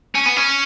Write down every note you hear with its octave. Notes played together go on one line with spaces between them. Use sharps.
C#4
B3
C#4